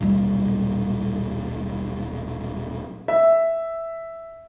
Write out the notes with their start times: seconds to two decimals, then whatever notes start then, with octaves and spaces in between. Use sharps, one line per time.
0.01 D#1 B1 A#2 G3
3.08 E5